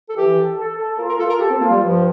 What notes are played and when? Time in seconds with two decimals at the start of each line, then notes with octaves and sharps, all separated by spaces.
0.09 A4
0.15 E3 G4
0.37 A4
0.57 A4
0.78 A4
0.98 F4 A#4
1.09 A#4
1.19 F4 A4
1.29 A#4
1.40 G4 A4
1.50 C4
1.61 A#3 F4
1.70 G3
1.80 G2 F3